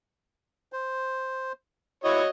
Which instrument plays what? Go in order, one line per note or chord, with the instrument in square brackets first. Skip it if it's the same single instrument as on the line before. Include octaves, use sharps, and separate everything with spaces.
[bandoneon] C5
[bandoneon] E4 [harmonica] F#4 C#5 D#5